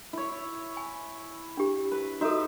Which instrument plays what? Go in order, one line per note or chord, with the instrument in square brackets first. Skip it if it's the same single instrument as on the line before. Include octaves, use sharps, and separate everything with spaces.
[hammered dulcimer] E4 C#5
[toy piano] G#5
D4 G4
[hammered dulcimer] B4
[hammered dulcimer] D#4 E5 [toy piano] F#4 A4